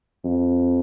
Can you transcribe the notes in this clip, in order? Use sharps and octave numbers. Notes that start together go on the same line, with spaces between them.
F2